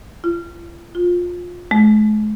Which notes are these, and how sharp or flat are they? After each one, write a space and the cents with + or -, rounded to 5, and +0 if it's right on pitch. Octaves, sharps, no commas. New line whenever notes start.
F4 -40
F4 +20
G#3 +45